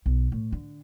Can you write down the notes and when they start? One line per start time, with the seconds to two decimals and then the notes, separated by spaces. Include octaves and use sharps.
0.06 B1
0.32 A2
0.52 D3